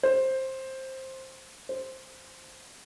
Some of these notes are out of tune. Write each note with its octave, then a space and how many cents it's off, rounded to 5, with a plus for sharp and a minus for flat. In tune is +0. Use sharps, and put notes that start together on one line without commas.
C5 +10
C5 +0